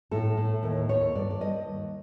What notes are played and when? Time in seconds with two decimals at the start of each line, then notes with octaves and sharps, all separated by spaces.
0.11 A2 A4
0.37 A2
0.63 D#2
0.89 D#2 C#5
1.15 G2 D5
1.30 D5
1.41 G2 D#5
1.67 D#2